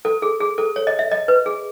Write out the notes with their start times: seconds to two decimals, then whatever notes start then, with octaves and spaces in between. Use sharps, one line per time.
0.05 A4
0.22 G#4
0.41 G#4
0.58 A4
0.76 C#5
0.87 D#5
0.99 E5
1.11 D#5
1.28 B4
1.46 G#4